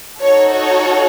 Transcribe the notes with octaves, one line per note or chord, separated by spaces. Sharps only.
D#4 F#4 A4 C#5
C#5